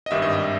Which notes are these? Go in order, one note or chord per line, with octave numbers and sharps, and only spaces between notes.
D#5
G#1 G2 D#3 G3 E5
D#5
E5